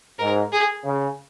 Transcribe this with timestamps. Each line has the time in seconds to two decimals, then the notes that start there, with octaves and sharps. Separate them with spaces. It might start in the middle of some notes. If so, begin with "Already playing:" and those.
0.19 G#2 A#4
0.52 G#4
0.84 C#3